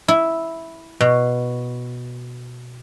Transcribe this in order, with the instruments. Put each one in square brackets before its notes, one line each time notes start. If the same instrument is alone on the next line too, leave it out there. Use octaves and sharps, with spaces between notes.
[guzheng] E4
B2